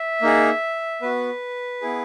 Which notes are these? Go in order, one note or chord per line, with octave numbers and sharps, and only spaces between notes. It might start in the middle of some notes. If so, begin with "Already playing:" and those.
Already playing: E5
A#3 D#4 G#4
B3 F#4 B4
B3 E4 G#4